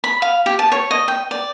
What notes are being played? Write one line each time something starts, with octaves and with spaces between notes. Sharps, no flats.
B5
F5
G4
A5
C#5
D#5
G5
D5